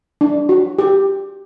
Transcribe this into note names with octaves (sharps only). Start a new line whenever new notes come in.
D4
F#4
G4